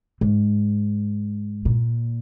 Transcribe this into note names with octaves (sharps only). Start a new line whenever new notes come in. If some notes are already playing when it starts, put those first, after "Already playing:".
G#2
A#2